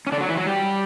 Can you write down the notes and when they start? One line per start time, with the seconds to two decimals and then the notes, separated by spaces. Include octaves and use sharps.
0.07 C#4
0.12 D3 D4
0.20 F#3 F#4
0.29 E3 E4
0.37 F#3 F#4
0.46 G3 G4